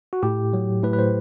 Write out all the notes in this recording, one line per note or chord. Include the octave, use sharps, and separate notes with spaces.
F#4
A2 G4
F#3
A2 B4
B4
C5